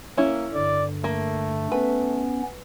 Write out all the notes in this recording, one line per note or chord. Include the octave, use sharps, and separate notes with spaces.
A#3 C#4 E4
G2 D3 D5
A3 A#3
B3 C#4 B4